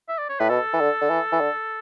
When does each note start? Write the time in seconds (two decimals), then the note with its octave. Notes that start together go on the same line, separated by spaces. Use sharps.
0.08 E5
0.18 D5
0.29 C#5
0.40 A2 B4
0.49 B2 A4
0.73 E3
0.81 D3
1.01 D3
1.10 E3
1.32 E3
1.40 D3